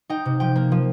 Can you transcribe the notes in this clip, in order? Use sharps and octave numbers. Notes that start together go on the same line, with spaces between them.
D#4 G5
C3
F3 G5
A#3
F3